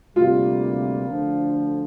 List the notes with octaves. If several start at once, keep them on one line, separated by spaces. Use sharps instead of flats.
D2 C3 G3 A#3 F4
D2 D3 F3